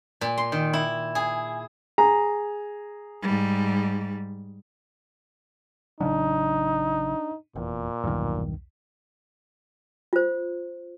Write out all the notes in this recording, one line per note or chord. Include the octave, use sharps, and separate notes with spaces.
A#2
C6
D#3
E4
G#4
G#4 A#5
G#2 G3
A1 C#3 F#3 D4 D#4
F1 E2 A#2
B1 E2 G2 D#3
F4 C5